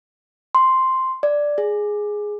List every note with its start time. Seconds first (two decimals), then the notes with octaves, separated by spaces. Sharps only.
0.55 C6
1.23 D5
1.58 G#4